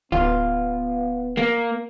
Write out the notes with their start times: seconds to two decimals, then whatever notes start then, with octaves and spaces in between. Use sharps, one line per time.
0.12 D1 B3 F4
1.37 A#3